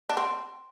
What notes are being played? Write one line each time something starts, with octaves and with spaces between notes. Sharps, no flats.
D4
C4